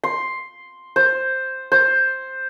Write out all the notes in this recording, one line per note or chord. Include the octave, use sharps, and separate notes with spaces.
C6
C5
C5